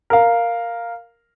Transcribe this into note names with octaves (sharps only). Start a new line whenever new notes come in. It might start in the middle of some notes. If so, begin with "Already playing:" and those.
A#4 F5